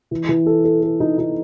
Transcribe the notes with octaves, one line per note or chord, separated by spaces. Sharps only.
E3
E3
A4
A4
A4
D#4
D#4